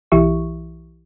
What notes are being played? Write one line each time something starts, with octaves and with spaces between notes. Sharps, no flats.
B1 E3 E4 G4 E5 C#6